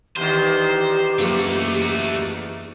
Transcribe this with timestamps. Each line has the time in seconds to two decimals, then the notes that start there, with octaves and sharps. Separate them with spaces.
0.17 E2 D#3 G4 C5
1.19 F#1 F3 A3 F#4 G#4